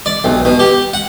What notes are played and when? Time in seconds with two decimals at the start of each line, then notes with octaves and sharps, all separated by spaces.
0.06 D5
0.24 B1
0.45 B2
0.59 G4
0.94 F#5